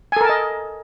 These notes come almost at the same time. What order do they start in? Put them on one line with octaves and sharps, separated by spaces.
G#5 A4 A#4 A5 D#5